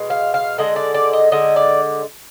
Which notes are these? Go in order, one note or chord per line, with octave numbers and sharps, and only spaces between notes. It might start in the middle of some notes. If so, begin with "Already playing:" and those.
Already playing: B2 G#3
F5
F5
D3 G#3 D#5
D5
D5
D#5
D3 G#3 D#5
D5